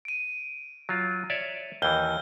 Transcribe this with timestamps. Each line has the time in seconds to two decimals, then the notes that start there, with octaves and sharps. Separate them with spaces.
0.05 D7 D#7
0.89 F#3 F4
1.30 C#5 D5 E5
1.82 D#2 E3 F6 G6 G7